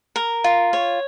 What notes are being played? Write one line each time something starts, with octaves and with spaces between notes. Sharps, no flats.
A#4
F4
C#5